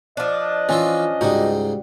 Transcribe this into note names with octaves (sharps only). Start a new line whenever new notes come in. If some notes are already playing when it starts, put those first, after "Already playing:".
F3 D4 D#5
E3 C#4 F4 E5 C6
C#2 G#2 G3 D#4 F#4